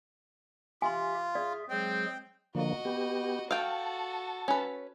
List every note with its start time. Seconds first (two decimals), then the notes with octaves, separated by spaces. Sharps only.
0.82 F4 G4 E5 G#5 C6
1.35 G#4 D5 E5
1.70 F#3 G#3 C4 G#4 G5
2.55 D3 F3 A#3 F#4 D#5
2.85 B3 G4
3.51 F#4 A4 F5 G5 A5
4.48 C#4 B4